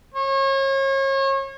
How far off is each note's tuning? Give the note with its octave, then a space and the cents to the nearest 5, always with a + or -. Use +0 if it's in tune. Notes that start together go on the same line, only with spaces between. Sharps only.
C#5 -35